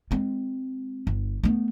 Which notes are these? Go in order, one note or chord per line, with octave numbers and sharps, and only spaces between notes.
G#3 C4
G1
A3 B3